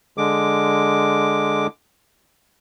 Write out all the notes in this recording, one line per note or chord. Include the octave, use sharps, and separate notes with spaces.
D3 G#3 D6